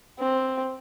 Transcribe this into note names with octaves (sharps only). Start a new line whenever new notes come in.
C4